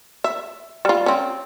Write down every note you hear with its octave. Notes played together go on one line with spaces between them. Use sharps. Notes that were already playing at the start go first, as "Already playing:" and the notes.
E5
G3 F4
C4 C#4